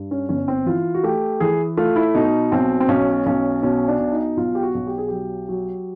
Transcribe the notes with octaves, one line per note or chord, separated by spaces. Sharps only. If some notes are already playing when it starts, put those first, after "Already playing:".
Already playing: G2
C#4
G1 C#4
C4
E3 F4
F#4
A3 G4
E3 G#4
A3 F4
E4
B2 D#4
B1 C4
C4
B1 C#4
B1 C#4
B2 C#4
D4
B2
D#4
B1 F4
G4
F#4
B1
G4
G#4
F#3 G4
F#3